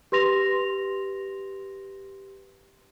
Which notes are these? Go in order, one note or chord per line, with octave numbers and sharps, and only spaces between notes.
G4 B4 C6 A#6 F7